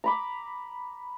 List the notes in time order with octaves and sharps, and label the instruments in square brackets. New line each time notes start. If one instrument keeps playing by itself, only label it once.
[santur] A#5 B5 D6